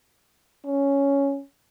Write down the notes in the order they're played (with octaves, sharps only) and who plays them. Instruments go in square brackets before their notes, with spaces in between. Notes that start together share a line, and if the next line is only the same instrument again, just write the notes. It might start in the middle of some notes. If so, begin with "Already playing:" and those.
[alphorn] C#4